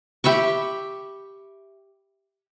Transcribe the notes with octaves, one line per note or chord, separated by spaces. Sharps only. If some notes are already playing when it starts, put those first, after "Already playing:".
G4 E5 B5 C#6